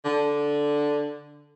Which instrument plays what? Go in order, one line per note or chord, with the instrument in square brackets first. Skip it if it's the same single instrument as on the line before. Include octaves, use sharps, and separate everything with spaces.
[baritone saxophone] D3